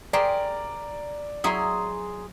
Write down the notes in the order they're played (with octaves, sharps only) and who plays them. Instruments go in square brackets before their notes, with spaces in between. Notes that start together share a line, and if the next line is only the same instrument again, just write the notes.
[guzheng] G4 G#4 C5 [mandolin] A#4 [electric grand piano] D5
[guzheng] F#3 E4 [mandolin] G#4 A#5 C6